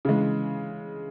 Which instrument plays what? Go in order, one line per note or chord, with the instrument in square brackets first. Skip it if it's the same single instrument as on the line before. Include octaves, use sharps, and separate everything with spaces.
[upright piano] C#3 E3 G#3